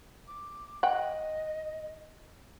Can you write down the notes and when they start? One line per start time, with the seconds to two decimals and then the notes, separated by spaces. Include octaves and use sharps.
0.27 D6
0.83 D#5 F#5 G5